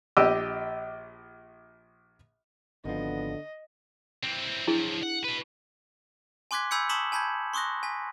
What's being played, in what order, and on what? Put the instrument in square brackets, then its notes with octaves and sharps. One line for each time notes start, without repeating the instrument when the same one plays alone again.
[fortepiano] A#1 D4 G4 D#5 D6 E6
[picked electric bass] G#1 F3 [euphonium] D3 [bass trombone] B3 [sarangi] D#5
[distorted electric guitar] E3 C4
[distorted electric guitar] F3 F#3 [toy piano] D4 E4 G#4
[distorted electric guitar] F#5
B2 B4
[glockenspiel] G#5 C6 D6 F#6 G#6 B6
G#5 B5 E6 G6 G#6 C#7
A5 C#6 D#6 B6 E7 F#7
G#5 A5 B5 G6 G#6
C6 C#6 D#6 F#6 A#6
G#5 B6